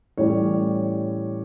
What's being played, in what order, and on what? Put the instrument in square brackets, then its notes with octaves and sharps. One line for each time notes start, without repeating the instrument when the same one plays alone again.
[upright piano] A2 E3 G3 C#4 C#5